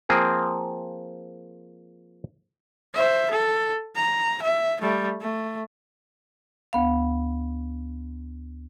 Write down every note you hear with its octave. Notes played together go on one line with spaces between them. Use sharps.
F3 A#3 C4 G#4
C5 E5
A4
A#5
E5
G3 A3
A3
D2 B3 F5